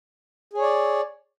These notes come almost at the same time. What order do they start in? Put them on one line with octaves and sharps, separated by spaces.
G#4 C#5 D5